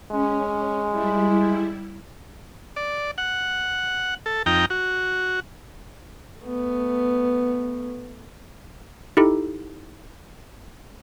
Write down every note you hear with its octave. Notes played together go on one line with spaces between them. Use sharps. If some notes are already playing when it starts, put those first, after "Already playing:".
G#3 C#4
G3 E4
D5
F#5
A4
F2 D#4 G5 A#5
F#4
A3 B3
D#4 E4 G4 A4